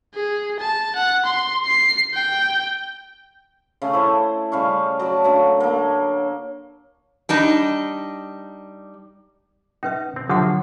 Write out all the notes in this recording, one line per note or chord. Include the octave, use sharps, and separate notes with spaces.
G#4
A5
F#5
C6
C7
G5
C#3 A3
E4 A4 C5
C#3 G3 F5 C#6
F#3 D5 A5
D3 F#3 A3 A#3
A#3 A4
G3 D4 D#4
C#4 D#4 B4 E5
C4
D3 F3 F#3 G4 E5 F#5